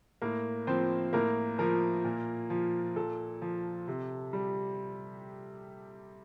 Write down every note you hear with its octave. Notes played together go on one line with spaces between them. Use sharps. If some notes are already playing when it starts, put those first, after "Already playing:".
A2 A#3 A#4
F3 C4 C5
A2 A#3 A#4
F3 A#3 A#4
A#2
F3
A#2 A4
F3
C3
G3